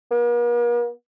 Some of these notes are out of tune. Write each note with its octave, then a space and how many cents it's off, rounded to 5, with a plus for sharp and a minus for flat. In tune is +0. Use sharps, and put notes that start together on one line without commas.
A#3 +45